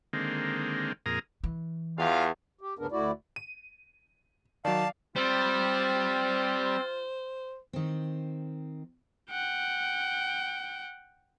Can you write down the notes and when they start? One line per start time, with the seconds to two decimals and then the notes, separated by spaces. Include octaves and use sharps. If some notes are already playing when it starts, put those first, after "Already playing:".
0.13 D3 D#3 G#3 A#3 C4
1.06 F2 A#2 G#4 A#4 A#5 D#6
1.44 E3
1.98 E2 G3 F4 F5
2.61 G4
2.79 D2 G2 C#3 B3 D4 A#4
2.92 D2 A3 E4 F#4 D5
3.36 D#7
4.65 D#3 F#3 D5 F5 A5
5.16 G3 C4 F4 C5
7.73 D#3 C4
9.30 F#5 G5